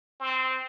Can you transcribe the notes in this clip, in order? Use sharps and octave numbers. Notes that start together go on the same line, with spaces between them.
C4